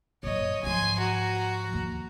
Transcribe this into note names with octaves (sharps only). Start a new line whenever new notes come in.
F#2 A#2 C#5 D#5
G#2 F3 G#5 C6
F#4 A#5
D#2 E3